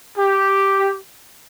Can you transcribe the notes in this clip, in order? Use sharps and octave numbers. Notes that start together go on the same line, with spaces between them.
G4